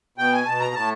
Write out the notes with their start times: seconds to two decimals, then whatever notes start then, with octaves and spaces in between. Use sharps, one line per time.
0.18 B2 G5
0.33 G#5
0.46 B2 A5
0.60 A#5
0.74 A2 A5